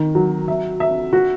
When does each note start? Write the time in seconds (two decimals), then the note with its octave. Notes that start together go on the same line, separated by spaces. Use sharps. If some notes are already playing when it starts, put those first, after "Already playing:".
Already playing: D#3
0.15 F#3
0.48 E5
0.80 E5
1.13 F#4